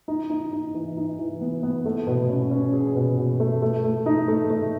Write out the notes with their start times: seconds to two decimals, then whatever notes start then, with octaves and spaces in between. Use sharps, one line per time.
0.08 D#4
0.30 D#4
0.53 D#4
0.74 E3
0.97 D#4
1.19 E3
1.41 B3
1.63 B3
1.86 A3
2.07 B2
2.29 C#4
2.51 C#4
2.73 G#4
2.96 B2
3.18 B2
3.40 A3
3.62 A3
3.84 A3
4.06 D#4
4.28 A3
4.50 A3